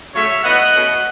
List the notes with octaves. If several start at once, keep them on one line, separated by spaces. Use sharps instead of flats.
C#3 F#3 A3 C#4 C#5 E5
A2 E3 B3 D#5 F#5
B2 A3 C#4